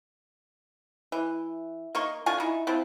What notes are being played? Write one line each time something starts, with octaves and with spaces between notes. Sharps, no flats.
E3
A#3 D#4 C6 C#6
D3 F4 G#5 C#6
D#4 E4
F3 C4 E4